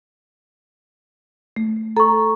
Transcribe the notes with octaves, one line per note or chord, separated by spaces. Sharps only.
A3
A4 A#5 C#6